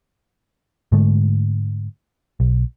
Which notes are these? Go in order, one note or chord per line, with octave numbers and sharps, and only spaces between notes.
G#2 D3 G#3 A3
B1